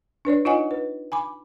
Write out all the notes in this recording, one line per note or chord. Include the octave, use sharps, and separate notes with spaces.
D4 B4 C#5 D5
D#4 F4 C#5 D#5 F#5 G#5
B4
G#5 B5 D6